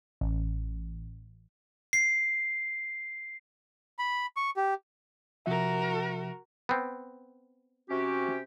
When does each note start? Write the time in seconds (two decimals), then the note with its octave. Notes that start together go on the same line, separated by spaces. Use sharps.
0.21 A1
1.93 C7
3.99 B5
4.37 C#6
4.57 G4
5.46 C3 F3 F#4 A#4 E5
6.69 B3 C4
7.90 C3 C#4 F#4 G4